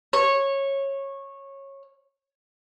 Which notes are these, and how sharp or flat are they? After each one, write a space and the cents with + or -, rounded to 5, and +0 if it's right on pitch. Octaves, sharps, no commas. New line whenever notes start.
C#5 -15